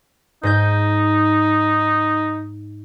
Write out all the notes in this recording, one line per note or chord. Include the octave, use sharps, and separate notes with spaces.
G#2 D#4 D#5 G6